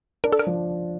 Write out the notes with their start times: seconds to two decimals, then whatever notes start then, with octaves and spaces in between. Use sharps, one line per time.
0.24 D4 A#4
0.32 A4
0.39 A#4
0.47 F3